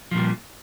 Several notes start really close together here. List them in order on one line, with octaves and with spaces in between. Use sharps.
F3 A#2 G3